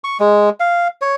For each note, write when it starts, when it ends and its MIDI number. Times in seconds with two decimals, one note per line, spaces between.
0.04 0.17 85
0.20 0.50 56
0.60 0.88 77
1.02 1.16 73